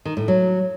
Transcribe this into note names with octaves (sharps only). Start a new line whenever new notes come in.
D#3
A2
F#3